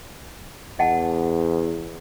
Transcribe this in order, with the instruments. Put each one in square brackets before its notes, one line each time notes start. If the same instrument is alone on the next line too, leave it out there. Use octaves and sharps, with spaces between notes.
[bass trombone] E2 [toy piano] D#5 F#5 A5